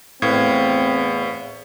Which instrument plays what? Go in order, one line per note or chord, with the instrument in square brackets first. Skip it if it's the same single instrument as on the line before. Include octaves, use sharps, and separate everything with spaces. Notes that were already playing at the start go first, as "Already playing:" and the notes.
[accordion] E2 [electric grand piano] A2 [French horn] C4 [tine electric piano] B4 F5 G#6